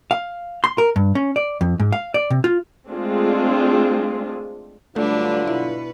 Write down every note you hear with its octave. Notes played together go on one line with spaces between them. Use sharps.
F5
C6
A#4
G2
C#4
D5
F2
G#2
F5
D5
C3
F4
G#3 A3 C4 D4 F4 G#4
G2 D3 F#3 G3 A3 D4 F4 B4
B2 E4 B4